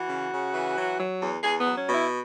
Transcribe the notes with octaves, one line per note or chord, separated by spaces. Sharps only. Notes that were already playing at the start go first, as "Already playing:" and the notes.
Already playing: E3 F#4
C#3
C#3
E3
F#3
F#3
E2
E2 G#4
B3
F#3
C#4
B2
E4